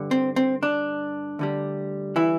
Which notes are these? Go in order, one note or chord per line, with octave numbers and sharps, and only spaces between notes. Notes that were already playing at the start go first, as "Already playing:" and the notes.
Already playing: G2 D3
C4
C4
D4
D2 D3 G3
E3 E4